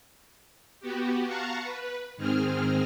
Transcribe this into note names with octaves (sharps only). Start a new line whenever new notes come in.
B3 F#4 G4
F5 F#5 A5 A#5 C#6
B4
G#2 D#3 C4 G#4 F6